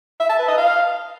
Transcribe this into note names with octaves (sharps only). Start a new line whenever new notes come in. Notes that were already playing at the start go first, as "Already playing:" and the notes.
E5
A5
B4
D#5
F5